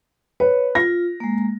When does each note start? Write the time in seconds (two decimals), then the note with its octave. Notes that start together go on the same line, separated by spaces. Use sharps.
0.40 B4 C#5
0.75 F4 A#6
1.20 G#3 A#3